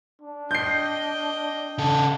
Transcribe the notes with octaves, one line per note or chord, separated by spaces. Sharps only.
D4
D#5 G5 G6 C7
C#3 A4